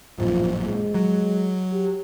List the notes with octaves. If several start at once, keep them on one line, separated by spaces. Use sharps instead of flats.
A1 F#2 A#2 F3
G#3
F#3
G4